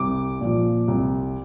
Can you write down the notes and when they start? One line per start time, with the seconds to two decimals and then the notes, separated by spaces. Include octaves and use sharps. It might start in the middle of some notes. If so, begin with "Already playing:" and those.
Already playing: C2 D6
0.41 A#2 F3
0.88 C2